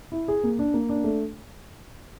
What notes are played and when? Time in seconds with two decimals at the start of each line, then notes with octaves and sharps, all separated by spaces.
0.12 E4
0.28 G#4
0.43 A#3
0.59 D4
0.74 A#3
0.89 D4
1.04 A3